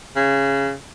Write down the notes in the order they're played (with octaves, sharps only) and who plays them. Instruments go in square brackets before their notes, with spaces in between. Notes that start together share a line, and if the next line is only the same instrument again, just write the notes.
[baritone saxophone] C#3